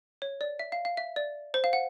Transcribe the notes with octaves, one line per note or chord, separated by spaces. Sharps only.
C#5
D5
E5
F5
F5
E5
D5
C5
F5
F#5